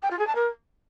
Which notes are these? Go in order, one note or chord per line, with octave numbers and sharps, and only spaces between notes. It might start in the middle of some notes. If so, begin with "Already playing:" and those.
G5
F4
G#4
A5
A#4